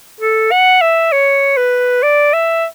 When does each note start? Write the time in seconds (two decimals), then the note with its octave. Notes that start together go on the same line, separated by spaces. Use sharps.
0.20 A4
0.51 F#5
0.81 E5
1.12 C#5
1.57 B4
2.03 D5
2.33 E5